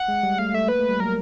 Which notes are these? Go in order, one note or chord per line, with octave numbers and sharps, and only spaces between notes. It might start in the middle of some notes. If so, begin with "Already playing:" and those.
Already playing: F#5
G#3
G3
A3 F5
A3 E5
A#3 B4
A3
G3
F#3 A#4